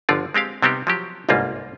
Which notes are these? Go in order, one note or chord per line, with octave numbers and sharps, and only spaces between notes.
G1 D3 F3 F4 D5
G#3 C4 G4 F5
C3 G3 B3 C4 D#4 G4
F3 F#3 G4
G1 C2 G#2 G3 A#3 F4